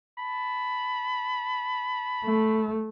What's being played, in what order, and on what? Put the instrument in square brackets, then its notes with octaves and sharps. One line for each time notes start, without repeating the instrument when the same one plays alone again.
[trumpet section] A5 B5
[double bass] A3